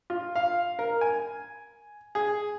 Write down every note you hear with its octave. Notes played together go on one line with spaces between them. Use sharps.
F4
F5
A#4
G#5
G#4